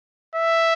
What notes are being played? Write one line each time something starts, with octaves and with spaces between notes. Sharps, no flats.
E5